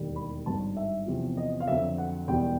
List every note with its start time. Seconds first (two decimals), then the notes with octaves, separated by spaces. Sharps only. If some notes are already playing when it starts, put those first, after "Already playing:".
Already playing: E1 D#2 D#3 G3
0.16 B5
0.46 G#1 G2 D#3 F#3 A5
0.77 E5
1.06 E2 C3 F3
1.37 D#5
1.60 F5
1.67 F2 D3 F#3 E5
1.98 F#5
2.28 E1 E2 B2 G3 G5